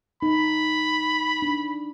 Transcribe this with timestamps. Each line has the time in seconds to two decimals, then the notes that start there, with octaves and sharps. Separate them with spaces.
0.23 D#4 B5
1.42 D4